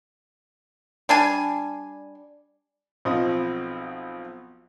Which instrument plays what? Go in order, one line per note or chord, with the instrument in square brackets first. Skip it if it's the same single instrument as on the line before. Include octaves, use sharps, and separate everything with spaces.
[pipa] G3 D4 G#5
[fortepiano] B1 F3 C4 D#5 D#6